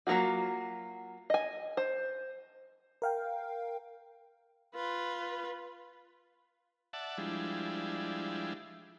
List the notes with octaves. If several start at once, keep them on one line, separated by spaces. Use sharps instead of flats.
F#3 A#3 D#4 F4 F#4
D#5 G#5
C5
A#4 F5 G5
F4 B4
D5 E5 F#5 A5
F3 G3 G#3 D4 E4